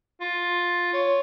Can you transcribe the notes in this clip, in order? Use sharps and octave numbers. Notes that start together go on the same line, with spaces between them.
F4
C#5